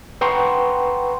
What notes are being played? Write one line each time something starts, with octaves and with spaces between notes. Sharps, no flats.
B4 F#5 G5 A#5 C6 C#6